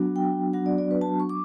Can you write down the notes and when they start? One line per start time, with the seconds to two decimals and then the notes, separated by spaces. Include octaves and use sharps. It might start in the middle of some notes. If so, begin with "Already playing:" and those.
Already playing: F#3 B3 D4 F#4
0.16 G5
0.53 F#3 B3 D4 F#4 F#5
0.66 D5
0.78 D5
0.91 B4
1.01 A5
1.20 C#6
1.29 D6